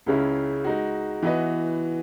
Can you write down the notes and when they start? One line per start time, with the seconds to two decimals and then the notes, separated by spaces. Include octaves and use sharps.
0.06 C#2 C#3 G#3 C#4 E4
0.64 G#3 D#4 F#4
1.22 E3 B3 F#4 B4 D#5